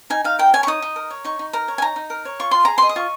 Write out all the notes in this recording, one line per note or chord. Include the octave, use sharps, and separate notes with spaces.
D#4 G#5
D#4 F5
A#4 G5
C#5 G#5
C#6
D#4 D#6
D#4
A#4
C#5
D#4 C#6
D#4
A#4 A#5
C#5
G#5
D#4 A#5
D#4
A#4
C#5
F4 C#6
F4 C6
G#4 A#5
D#5 C6
D#6
F4 C#6